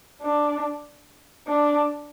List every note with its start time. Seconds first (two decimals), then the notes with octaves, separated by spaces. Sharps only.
0.22 D4
1.47 D4